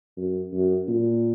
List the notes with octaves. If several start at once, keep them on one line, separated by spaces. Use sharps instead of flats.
F#2
F#2
A#2